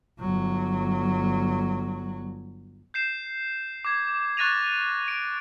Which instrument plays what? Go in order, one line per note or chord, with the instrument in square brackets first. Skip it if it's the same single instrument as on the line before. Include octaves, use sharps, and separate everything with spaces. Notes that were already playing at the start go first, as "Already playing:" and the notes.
[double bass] G1 F#3
[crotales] G6 C7 E7
D6 G#6
C#6 F#6 A6 A#6 D#7 F7
D7